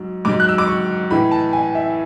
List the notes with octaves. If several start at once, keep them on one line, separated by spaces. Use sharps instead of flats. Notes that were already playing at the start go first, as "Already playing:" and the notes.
Already playing: G#2 F#3
G#2 F#3 D6
F#6
E6
D6
C#6
A2 E3 B5
A5
G#5
E5